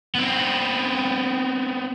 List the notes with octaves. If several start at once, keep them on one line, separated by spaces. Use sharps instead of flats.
B3 C4